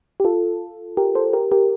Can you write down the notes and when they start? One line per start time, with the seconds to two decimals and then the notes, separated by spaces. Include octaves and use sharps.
0.20 G4
0.24 F4 A4
0.97 G4 A#4
1.15 A4 C5
1.33 G4 A#4
1.52 G4 A#4